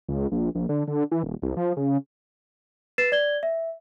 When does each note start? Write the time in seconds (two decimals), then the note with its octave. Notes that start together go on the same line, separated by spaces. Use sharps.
0.09 C#2
0.32 A#1
0.55 A#1
0.69 D3
0.88 D3
1.12 E3
1.23 D#1
1.42 C2
1.57 F3
1.77 C#3
2.98 B4 A6 C7 E7
3.12 D5 G#6 G7
3.43 E5